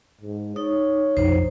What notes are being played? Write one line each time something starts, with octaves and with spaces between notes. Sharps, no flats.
G#2
D#4 C#5
B1 F2 D#4 C5